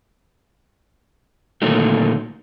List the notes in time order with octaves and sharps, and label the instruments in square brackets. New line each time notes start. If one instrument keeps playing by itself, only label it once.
[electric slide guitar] A#2 D3 D#3 F#3 A3